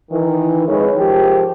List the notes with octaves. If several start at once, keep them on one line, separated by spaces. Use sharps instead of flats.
D#3 E3 D#4
F2 C#3 G#3 D#4 B4 C#5
G#2 D#3 F3 G4